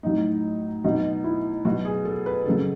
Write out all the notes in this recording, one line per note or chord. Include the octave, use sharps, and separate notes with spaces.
A2 F#3 D#4
B2 F#3 D#4
E4
B2 F#3 F#4
G#4
A4
B4
C#3 F#3 A4